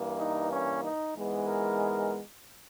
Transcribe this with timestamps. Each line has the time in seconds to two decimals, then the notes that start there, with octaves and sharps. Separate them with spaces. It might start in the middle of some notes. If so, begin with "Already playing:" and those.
Already playing: G2 E3 A#3
0.16 D#4
0.49 C#4
0.82 D#4
1.14 G#2 E3 G#3 B3
1.47 A#4